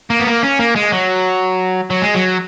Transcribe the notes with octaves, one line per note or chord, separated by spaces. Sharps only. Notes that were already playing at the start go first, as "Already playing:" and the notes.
A#3
B3
A#3
C#4
A#3
G#3
F#3
F#3
G#3
F#3